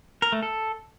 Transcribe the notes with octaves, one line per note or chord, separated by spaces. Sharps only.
A#4
A3
A4